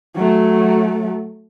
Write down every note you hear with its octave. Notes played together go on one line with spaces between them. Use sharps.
F#3 A3